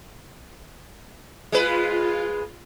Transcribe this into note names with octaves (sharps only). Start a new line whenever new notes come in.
G#3 F4 B4